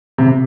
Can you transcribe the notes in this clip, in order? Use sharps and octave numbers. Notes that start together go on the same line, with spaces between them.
C3